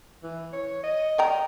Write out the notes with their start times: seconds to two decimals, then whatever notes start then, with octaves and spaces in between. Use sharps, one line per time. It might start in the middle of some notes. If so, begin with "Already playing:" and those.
0.23 E3
0.53 C#5
0.83 D#5
1.18 D5 G5 A#5